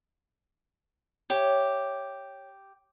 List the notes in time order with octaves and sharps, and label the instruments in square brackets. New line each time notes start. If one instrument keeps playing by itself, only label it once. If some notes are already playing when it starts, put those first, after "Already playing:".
[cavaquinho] G4 [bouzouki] C#5 E5 G5